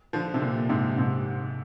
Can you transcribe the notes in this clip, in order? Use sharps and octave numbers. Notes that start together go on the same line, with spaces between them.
D3 F3
C3
A#2 D3
G#2 C3
G#2 C3